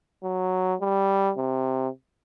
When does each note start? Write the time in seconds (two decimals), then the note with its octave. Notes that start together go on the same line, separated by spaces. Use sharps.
0.24 F#3
0.81 G3
1.37 C3